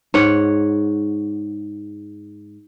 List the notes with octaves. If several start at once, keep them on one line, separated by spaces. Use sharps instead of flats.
G#2 C#5 F#5